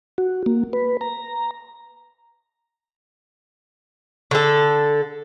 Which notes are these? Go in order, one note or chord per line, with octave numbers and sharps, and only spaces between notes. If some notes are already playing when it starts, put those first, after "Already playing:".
F#4
A#3
B4
A#5
D3 A4